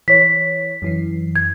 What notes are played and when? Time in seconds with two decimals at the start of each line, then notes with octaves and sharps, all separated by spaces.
0.08 E3 C#5 B6
0.82 F#2 E3 C7
1.36 G#6